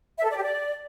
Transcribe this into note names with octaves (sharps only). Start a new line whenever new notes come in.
E5
A4
D5
G4
D5